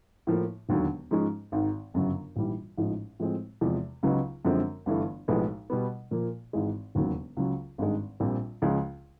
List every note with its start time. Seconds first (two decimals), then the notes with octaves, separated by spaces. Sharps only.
0.27 A2 F3 A#3
0.69 E1 D#2 D3 F#3
1.11 G#2 F3 G#3 C#4
1.52 G#1 G#2 D#3
1.94 G1 F#2 C#3 F#3
2.36 A#1 G#2 E3 G3
2.78 A1 G#2 F3 G#3
3.19 A2 F3 G#3 C4
3.61 E2 C3 F3 G#3
4.03 C#2 C#3 F#3 B3 D#4
4.45 F#2 D3 F3 G#3 C4
4.86 G1 G2 E3 A3
5.28 B1 A2 F3 G#3 B3
5.70 B2 G3 B3
6.11 A#2 F3 A#3
6.53 G#1 G#2 E3 G#3
6.95 E1 D#2 C#3 F#3 A#3
7.37 C#2 C#3 F#3
7.78 G#1 G2 D#3 G#3
8.20 A#1 A#2 G3 C4
8.62 C#2 C#3 F3 G#3